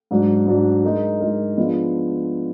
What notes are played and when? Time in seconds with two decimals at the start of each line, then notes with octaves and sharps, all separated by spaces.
0.11 G#2 F#3 D4
0.47 G#2 F#3 D4
0.84 G#3 D#4 A#4
1.20 G#3 D#4 A#4
1.57 F3 G#3 B3 D4